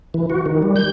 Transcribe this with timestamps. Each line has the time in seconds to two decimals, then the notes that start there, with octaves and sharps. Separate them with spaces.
0.14 E3
0.30 F#4
0.46 D#3
0.62 G3
0.76 G6